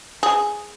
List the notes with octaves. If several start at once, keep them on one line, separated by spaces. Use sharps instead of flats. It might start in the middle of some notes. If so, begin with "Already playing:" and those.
G#4